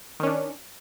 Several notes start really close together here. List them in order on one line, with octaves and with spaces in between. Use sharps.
D#3 C#4 D4